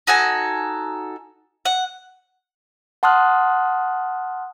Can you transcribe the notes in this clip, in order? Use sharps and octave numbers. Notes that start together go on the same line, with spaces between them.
D#4 F#4 A4 G#5
F#5
F#5 A5 C6 D#6 F6 F#6